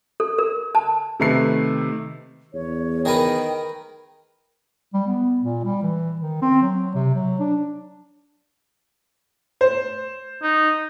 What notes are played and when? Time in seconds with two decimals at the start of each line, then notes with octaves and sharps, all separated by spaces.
0.20 A4
0.38 A#4
0.75 A5
1.20 C3 D#3 A3 B4 C7
2.54 E2 C#5
3.05 D#3 G#4 A#4 B4 G5
4.93 G3
5.07 B3
5.41 A#2
5.65 G3
5.83 E3
6.21 D#3
6.42 C4
6.62 F#3
6.95 C3
7.15 F#3
7.40 D4
9.61 C5
10.43 D#4